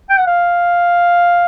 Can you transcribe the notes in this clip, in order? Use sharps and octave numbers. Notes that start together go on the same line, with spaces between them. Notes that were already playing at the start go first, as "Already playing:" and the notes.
G5
F#5
F5